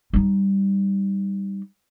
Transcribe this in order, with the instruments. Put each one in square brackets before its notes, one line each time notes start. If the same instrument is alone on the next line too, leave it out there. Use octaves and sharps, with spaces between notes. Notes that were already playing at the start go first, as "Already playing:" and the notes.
[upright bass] G3 D#4